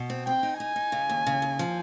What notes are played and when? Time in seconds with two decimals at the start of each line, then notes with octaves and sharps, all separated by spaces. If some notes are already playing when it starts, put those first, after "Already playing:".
Already playing: B2
0.10 C4
0.26 C4 G5
0.43 D#4
0.60 D#4 G#5
0.76 D#4
0.92 C#3
1.09 D#2
1.27 C#3
1.42 D#2
1.59 F3